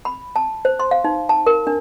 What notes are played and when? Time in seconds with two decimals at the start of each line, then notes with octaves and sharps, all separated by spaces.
0.05 B5
0.36 A5
0.65 C5
0.80 C6
0.91 F5
1.04 D#4
1.29 A5
1.46 A#4
1.67 D4